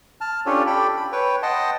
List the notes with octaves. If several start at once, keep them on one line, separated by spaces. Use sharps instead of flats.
A5 F6
C#4 D4 F4 G4 A4 C#5
G4 A4 G5 B5
B5
B4 C#5 G5
D#5 F#5 G5 A5 C6